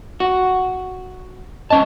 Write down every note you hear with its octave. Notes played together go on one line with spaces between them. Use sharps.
F#4
C2 C#4 D#5 A5